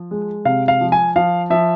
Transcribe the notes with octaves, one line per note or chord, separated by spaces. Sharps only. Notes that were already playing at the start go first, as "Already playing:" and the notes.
Already playing: F3
G#3
C3 F5
F5
F3
G#5
F3 F5
F3 E5